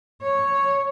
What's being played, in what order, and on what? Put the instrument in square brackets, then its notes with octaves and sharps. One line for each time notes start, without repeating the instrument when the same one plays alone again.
[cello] C#5